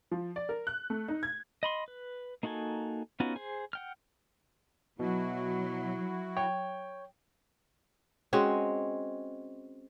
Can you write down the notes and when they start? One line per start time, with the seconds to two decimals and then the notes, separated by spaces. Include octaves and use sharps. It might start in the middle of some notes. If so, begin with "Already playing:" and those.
0.11 F3
0.36 D5
0.49 A#4
0.67 F#6
0.90 A3
1.08 D#4
1.23 G#6
1.63 D#5 B5 C6
1.88 B4
2.43 A#3 D#4 F#4 A4 G#5
3.20 B3 C#4 D#4 F4 F#4
3.36 G#4 C5
3.73 F#5 G5 F6
4.99 B2 F#3 E4 F#4
6.37 C#5 G5
8.33 G#3 C4 C#4 F#4